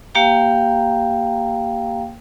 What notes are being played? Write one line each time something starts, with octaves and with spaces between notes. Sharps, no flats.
A#3 G4 F5 G5 A#5